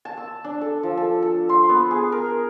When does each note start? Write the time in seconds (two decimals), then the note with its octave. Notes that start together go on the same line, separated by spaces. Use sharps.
0.05 A5
0.17 E6
0.44 D4
0.61 A4
0.83 F3
0.97 A4
1.22 A4
1.49 C6
1.69 B3
1.91 G#4
2.12 A#4